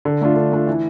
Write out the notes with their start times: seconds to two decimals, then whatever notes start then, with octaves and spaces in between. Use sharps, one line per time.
0.05 D3
0.21 A3 D4 F4
0.36 D3
0.52 A3 D4 F4
0.67 E3